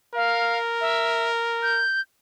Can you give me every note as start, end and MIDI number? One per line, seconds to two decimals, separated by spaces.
0.15 1.82 70
0.15 0.58 77
0.81 1.30 76
1.63 2.01 91